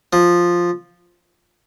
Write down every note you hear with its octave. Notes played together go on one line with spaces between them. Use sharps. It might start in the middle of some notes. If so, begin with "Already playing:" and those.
F3